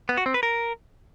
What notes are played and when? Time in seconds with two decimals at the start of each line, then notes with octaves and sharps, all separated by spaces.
0.09 B3
0.17 F#4
0.26 C4
0.34 B4
0.43 A#4